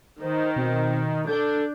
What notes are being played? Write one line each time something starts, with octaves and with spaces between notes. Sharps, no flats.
D#3 C5
B2 C4
D4 A4 G6